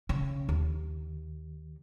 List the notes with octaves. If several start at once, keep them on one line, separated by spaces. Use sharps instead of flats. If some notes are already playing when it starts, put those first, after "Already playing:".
C#3
D#2